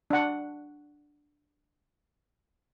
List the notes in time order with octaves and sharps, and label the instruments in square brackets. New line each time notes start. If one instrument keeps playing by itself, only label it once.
[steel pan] D4 F#5